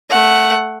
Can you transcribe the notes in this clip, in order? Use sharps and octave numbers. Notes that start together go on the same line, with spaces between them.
A3 F#5